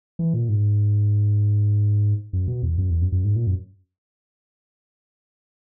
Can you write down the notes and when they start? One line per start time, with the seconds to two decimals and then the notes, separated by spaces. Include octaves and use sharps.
0.19 E3
0.34 A#2
0.49 G#2
2.33 F#2
2.48 B2
2.63 E2
2.78 F#2
2.90 E2
3.02 F#2
3.12 F#2
3.24 G#2
3.36 A#2
3.47 F#2